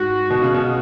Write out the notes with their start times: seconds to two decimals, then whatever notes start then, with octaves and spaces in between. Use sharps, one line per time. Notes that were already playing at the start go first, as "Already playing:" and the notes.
Already playing: G#2 F#4
0.30 B2
0.42 C#3
0.54 B2